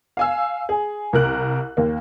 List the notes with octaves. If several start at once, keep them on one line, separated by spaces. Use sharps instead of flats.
F5 G#5 E6
G#4
C2 A#4 F#6
D#2 A#3